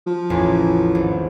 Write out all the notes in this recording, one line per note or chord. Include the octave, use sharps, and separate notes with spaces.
F3
A1 E2
G#1